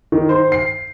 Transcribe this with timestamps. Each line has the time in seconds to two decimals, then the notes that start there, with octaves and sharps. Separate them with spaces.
0.12 D#3
0.29 C5
0.52 C7